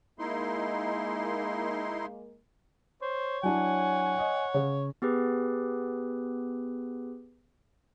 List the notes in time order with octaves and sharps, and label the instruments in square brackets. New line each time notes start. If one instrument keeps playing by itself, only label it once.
[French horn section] G#3 A#3 [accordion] D#4 E4 C6
[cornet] C5 [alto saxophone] C#5
[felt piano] F#3 D4 E4 [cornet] F#5 [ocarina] G#5
[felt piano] D#5
C#3
[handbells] B3 G4 G#4 B4